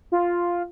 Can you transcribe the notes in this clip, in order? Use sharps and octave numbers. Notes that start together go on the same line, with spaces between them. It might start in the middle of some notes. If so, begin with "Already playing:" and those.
F4